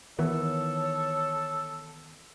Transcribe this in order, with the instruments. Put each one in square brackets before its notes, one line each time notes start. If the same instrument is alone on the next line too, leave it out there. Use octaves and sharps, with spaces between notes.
[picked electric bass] D#3 E3 B3 [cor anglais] A4 [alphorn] C#5